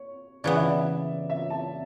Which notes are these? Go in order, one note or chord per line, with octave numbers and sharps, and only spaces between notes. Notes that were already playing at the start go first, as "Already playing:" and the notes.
Already playing: C#5
C#3 E3 B3 D5
E5
D5
E5
A5